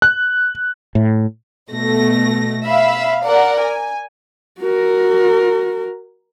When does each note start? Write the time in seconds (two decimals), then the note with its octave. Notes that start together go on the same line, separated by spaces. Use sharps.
0.02 F#6
0.95 A2
1.70 B2 A3 A#6
2.65 E5 F5 B5
3.24 A#4 D5 F#5
3.61 G#5
4.60 F#4 A#4